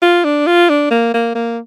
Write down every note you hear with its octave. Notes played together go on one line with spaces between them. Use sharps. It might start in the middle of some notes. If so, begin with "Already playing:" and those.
F4
D4
F4
D4
A#3
A#3
A#3